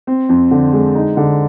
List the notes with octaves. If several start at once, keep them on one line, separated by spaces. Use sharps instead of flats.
C4
F2
D3
G#3
D#4
D3